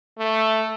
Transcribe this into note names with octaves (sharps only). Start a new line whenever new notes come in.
A3